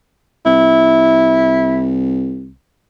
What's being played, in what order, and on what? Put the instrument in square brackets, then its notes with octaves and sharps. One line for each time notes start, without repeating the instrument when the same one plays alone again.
[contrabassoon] C2 [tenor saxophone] E4